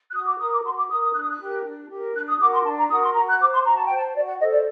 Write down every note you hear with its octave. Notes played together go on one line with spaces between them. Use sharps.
F#6
F#4 D#6
D6
A#4 D#6
D6
F#4 C6
D6
A#4 D#6
D#6
D4 F#6
D#6
F#6
G4 A#4
D4
G4 A#4
D4 F#6
D#6
F#4 A#4 D6
C6
D4 A5
A#5
F#4 A#4 D#6
C6
F#4 A#5
F#6
C5 D6
C6
F#4 A#5
A5
G5
C5
A5
F#4 D5
F#5
A4 C5 D#5
D5